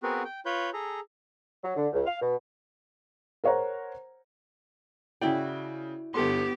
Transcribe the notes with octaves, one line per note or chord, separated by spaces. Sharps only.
B3 C4 F#4 G#4 A#4 B4
G5
F4 B4 C#5 B5 G6
G#4 A4 A#5
F#3
D3
C#2
F5
B2
A#4 C5 C#5 F#5 A#5
C#3 E4 F#4 D5 G5
G1 B3 G4 A4 C6